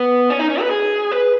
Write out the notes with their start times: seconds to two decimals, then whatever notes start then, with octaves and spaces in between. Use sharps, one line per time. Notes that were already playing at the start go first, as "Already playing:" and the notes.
Already playing: B3
0.30 C#4
0.39 D#4
0.49 C#4
0.61 B4
0.71 G#4
1.11 B4